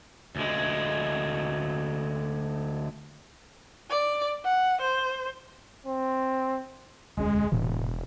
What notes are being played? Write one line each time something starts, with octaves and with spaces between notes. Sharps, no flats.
D2 G#3
D5
F#5
C5
C4
E1 D2 G#3 C#4
E1 A2 C3 E3